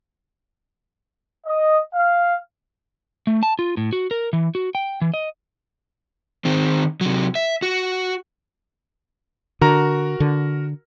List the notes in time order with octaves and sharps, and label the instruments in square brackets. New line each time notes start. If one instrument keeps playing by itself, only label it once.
[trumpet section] D#5
F5
[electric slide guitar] A3
A5
F4
A2
F#4
A#4
E3
F#4
G5
E3
D#5
[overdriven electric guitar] D#3 C4
C3 F#3
E5
F#4
[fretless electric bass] D3 [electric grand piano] F#4 A#4 A#5
[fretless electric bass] D3